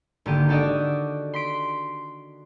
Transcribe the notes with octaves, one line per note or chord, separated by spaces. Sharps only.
G#1 D3 A#3 G4 D#7
D4 F#4 G4 A4 D5 D#5
C6 B6 D7